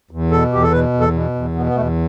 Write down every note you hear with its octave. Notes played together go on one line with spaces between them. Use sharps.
E2
B2 A4
E2 G4
A4
B2 B4
E2
A4
B2
E2
B2 B3
B3
E2 A3